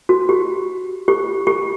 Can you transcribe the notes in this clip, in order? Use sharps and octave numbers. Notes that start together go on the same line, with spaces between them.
F#4
G4
G4
G4